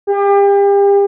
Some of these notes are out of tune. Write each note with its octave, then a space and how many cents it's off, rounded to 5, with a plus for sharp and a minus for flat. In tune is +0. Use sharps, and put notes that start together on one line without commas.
G4 +35